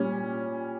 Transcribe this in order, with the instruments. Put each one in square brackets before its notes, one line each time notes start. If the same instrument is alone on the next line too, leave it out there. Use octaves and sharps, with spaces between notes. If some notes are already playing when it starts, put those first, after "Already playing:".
Already playing: [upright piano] A#2 G3 C#4